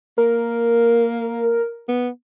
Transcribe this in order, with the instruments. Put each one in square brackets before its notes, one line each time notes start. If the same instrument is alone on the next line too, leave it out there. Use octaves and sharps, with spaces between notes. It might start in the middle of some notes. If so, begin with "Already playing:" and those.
[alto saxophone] A#3 [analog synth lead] A#4
[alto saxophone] B3